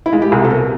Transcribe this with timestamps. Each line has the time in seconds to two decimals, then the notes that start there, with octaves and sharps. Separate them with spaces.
0.06 E4
0.12 G#3 F4
0.22 G4
0.32 C2 G#4
0.44 A4
0.50 B2 A#4